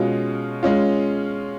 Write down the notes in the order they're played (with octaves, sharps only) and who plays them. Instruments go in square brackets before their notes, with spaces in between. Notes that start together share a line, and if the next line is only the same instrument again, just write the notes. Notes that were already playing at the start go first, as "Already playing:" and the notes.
Already playing: [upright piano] B2 G#3 C#4 F4
G#3 C#4 F4